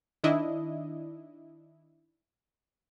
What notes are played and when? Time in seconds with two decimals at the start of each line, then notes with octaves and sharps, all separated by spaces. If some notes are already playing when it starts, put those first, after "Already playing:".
0.24 D#3 D4 E4 D#5